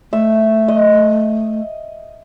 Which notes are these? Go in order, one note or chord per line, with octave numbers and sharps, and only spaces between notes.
A3 E5
D#5